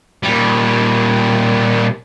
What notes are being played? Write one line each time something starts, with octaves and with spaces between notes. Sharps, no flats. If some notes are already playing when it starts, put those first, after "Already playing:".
A#2 G3